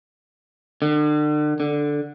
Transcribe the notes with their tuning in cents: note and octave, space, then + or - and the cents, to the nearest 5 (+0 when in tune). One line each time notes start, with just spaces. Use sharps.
D3 +40
D3 +0